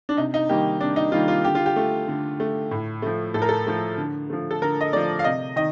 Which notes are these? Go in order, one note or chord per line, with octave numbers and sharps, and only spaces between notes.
D4
C3 D#4
D#4
D#3 G3 A#3 G4
C3 D4
D#4
D#3 G3 A#3 F4
F4
D3 G4
F4
G4
A3
D3
A3
A2
F3 A3
A2 A4
A#4
A4
F3 A3
D3
F3 A3
A4
D3 A#4
D#5
F3 A3 D5
F5
C3 D#5
D#3 D#5